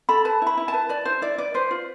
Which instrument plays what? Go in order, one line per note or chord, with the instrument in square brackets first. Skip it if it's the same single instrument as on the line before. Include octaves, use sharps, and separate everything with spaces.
[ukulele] A4 B5
B4 A5
E4
B5
E4
A5
B4
B4 D5
E4 C5
E4 D5
B4 D5
B4 C5
F4